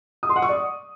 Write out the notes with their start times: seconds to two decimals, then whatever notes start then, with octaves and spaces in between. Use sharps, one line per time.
0.23 D#6
0.29 C6
0.36 F#5
0.42 C#6
0.49 D5